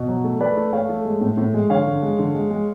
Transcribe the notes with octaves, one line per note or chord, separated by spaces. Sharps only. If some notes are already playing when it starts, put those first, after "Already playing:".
Already playing: B2
F#3
A3
A3 B4 D5
A3
A3 C#5 F5
A3
G#3
A2
A2
G#3
D3 C#5 F5
D3
G#3
D3
G#3
G#3